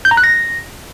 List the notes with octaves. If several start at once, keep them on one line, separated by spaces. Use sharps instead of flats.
G6
A#5
F#6
A#6